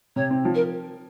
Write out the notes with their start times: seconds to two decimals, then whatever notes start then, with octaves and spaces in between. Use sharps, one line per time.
0.16 C3 C#5
0.30 C4
0.45 F3
0.55 A#4